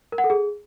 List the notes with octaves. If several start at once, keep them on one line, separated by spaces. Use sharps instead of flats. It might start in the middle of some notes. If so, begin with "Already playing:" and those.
A#4
F#5
A4
G#4